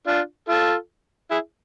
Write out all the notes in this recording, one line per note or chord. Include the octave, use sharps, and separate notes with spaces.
D4 F4
F4 A4
E4 G#4